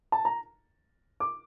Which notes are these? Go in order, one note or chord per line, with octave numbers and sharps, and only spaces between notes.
A5
A#5
D6